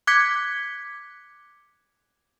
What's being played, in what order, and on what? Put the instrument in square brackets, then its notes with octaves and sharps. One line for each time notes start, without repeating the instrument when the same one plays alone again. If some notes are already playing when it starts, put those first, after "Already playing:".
[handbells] D6 F#6 G#6 B6 C#7